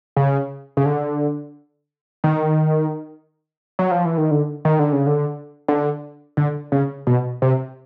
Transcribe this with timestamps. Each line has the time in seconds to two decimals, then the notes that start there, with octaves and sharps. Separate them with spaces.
0.16 C#3
0.77 C#3
0.85 D3
2.24 D#3
3.79 F#3
3.91 F3
4.05 E3
4.18 D#3
4.31 D3
4.65 D#3
4.79 D3
4.92 C#3
5.06 D3
5.69 D3
6.37 D3
6.72 C#3
7.07 B2
7.42 C3